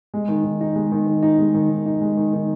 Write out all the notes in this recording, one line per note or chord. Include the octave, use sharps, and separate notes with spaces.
G#3
D#3
D#3
D#4
G#3
D#3
D#3
D#4
G#3
D#3
D#3
D#4
G#3
D#3
D#3